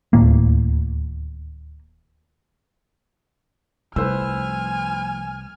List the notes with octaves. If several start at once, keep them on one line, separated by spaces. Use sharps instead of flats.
D1 D#2 A2 A#3
C2 F3 A3 B4 C5 G#5 E6 F6